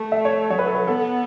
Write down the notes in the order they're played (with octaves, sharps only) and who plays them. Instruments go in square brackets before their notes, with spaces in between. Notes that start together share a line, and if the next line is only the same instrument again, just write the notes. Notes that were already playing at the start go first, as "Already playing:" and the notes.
Already playing: [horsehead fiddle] A3
[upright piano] E5
C#5
[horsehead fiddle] F#3 [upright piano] C#5
[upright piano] B4
A4
B4
[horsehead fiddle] B3 [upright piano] A4